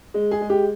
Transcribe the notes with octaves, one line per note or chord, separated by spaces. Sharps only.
G#3
G#4
G#3
G4